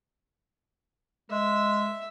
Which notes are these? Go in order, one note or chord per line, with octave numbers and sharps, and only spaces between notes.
G#3 E5